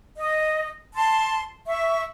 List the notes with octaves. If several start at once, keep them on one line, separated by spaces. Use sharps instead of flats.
D#5
A5 C6
E5 C#6